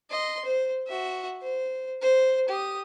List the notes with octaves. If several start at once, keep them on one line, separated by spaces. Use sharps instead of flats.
D#5 C6
C5
F#4 E5
C5
C5
G4 D#6